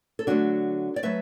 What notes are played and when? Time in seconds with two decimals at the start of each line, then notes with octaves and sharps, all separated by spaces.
0.19 A4
0.27 D3 F#3 A3 D4 F#4
0.96 D5
1.03 F#3 A3 B4 E5